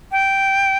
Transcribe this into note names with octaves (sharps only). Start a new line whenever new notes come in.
G5